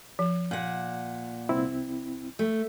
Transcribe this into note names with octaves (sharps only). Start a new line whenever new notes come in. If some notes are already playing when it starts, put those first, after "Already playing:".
F3
A#2 F#5
C2 C4 E4
A3